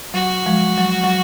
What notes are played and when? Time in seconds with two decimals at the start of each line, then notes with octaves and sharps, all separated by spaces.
0.14 F#3 F#4
0.46 F3 G#3
0.78 F#3
1.04 F#3